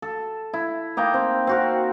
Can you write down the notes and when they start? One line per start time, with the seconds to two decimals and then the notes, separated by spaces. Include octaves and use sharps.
0.02 A4
0.53 E4
0.97 A#3 D#4 G5 A#5
1.14 C4
1.47 C4 F#4 A#4